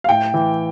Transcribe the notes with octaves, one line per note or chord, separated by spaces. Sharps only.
F5
A2 G5
E3